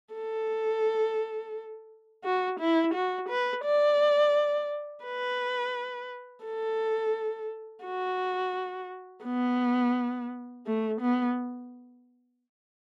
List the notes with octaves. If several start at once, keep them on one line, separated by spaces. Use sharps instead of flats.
A4
F#4
E4
F#4
B4
D5
B4
A4
F#4
B3
A3
B3